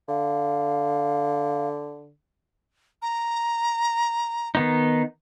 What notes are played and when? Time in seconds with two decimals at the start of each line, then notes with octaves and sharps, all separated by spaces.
0.09 D3 F5
3.02 A#5
4.55 D#3 B3 D#4